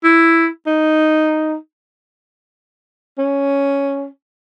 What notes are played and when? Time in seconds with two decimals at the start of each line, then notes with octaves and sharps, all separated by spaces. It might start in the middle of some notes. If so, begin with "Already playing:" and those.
0.04 E4
0.67 D#4
3.18 C#4